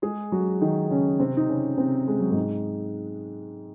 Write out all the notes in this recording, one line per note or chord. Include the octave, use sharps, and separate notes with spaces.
G#3 G#4
F#3 F#4
D#3 D#4
C#3 C#4
C3 C4
D#4
C#3 C#4
C3 C4
G#3
F#3
G#2 G#3